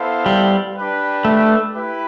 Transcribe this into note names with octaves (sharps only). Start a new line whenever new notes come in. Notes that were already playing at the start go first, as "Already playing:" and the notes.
Already playing: B3 E4 A4 C5 F5
G3
D4 G4 B4
A3
E4 G4 B4